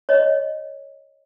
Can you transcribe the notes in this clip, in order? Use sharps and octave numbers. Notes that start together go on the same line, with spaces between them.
C#5 D#5